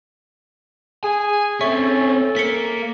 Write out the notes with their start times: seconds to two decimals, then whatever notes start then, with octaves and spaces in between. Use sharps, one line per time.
1.04 G#4 G#5
1.61 C4 C#4 A4 E5 C#6
2.36 A#3 B6 C#7